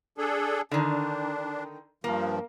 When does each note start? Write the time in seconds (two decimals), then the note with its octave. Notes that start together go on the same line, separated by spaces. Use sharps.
0.18 D4 G#4 A4
0.71 D3 D#3 D4
2.04 G2 F3 A#3